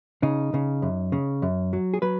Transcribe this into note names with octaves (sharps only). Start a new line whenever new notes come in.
C#3 D#4
C#3
F#2
C#3
F#2
F#3
G#4
F#3 B4